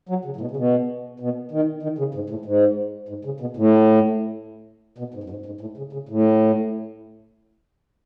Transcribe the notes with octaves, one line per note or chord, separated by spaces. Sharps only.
F#3
C#3
A2
B2
C#3
B2
B2
D#3
D#3
C#3
G#2
A2
G#2
G#2
C#3
B2
A2
B2
G#2
F#2
G#2
G#2
A2
C#3
C#3
A2